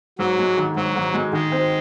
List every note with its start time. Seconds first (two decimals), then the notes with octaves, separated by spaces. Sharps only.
0.19 G#2 F#3
0.38 G#3
0.58 D#3
0.76 G#2 F#3
0.96 G#2
1.14 G#3
1.33 D#3 G#3
1.52 C4